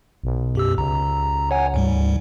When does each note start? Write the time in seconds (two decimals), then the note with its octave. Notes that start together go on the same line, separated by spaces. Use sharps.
0.24 B1
0.55 F#2 G4 E6
0.78 C#2 A#5
1.51 C#5 F#5 G#5
1.74 D2 G#2 G3